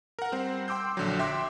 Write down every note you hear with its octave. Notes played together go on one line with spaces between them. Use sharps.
A#4 F#5
G3 C4 C5
G5 C6 D6 E6 G6
A#1 D3 F#3
E5 G5 C6 D6